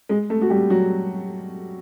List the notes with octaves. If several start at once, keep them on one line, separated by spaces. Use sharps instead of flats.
G#3 G#4
A3 A4
F#4
G3 G4
F#3 F#4